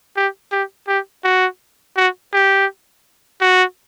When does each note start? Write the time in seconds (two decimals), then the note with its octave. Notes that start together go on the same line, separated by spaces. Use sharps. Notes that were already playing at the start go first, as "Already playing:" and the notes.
0.17 G4
0.52 G4
0.88 G4
1.24 F#4
1.97 F#4
2.33 G4
3.41 F#4